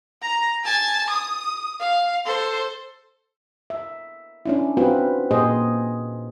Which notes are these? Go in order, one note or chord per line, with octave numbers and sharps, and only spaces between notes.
A#5
G#5 A5
D#6
F5
A4 C5
E5
C#4 D4 E4
C4 F4 F#4 B4
A#2 G#4 C5 D#5